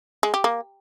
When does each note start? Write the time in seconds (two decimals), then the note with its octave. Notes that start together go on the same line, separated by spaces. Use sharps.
0.23 G#3
0.34 G4
0.44 A#3